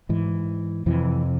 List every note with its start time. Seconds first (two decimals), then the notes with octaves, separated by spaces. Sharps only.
0.09 G#2 E3
0.86 F2 C3 E3